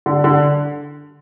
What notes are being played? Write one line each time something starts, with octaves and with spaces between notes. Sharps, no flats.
D3
D3